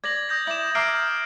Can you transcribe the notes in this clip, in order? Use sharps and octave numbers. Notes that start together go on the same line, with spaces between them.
D5 G#6 A#6 F#7
D#6 G6 A#6
E4 D5 E7 F#7
E5 A#5 D6 F6 C7 D7